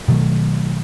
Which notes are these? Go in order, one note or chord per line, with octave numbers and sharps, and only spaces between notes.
B2 D#3 F#3 A3